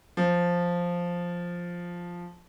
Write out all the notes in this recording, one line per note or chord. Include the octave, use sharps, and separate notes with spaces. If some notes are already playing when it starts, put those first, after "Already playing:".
F3